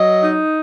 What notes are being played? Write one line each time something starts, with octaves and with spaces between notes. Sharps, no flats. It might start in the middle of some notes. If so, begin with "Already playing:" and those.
Already playing: F#3 D#5
D#4